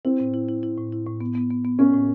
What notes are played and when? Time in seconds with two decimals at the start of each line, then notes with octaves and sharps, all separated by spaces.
0.05 C4 E4
0.20 A2
0.34 E4
0.48 E4
0.63 E4
0.78 A2
0.92 E4
1.06 A2
1.21 B3
1.35 B3
1.50 B3
1.65 B3
1.79 B3 C#4
1.94 A2